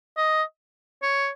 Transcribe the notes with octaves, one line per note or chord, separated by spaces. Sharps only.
D#5
C#5